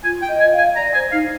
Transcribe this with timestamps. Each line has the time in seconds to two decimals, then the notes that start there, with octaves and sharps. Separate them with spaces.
0.04 F4 G#5
0.22 G5
0.28 D#5
0.40 G#5
0.52 F5
0.58 G#5
0.76 D5 A#5
0.94 C5 G#5
1.12 D#4 F5